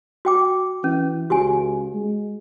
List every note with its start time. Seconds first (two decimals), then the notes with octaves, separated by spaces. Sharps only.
0.25 F#4 G5 D6
0.84 E3 C#4
1.30 C#2 F#4 G4 G#5
1.94 G#3